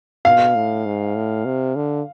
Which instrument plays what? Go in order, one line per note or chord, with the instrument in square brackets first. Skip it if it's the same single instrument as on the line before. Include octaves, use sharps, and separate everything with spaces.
[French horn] B2 [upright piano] F5
[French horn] A2
G#2
A2
C3
D3